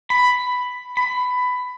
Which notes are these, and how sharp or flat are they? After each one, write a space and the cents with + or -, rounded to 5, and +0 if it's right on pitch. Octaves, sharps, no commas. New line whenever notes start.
B5 +5
B5 +15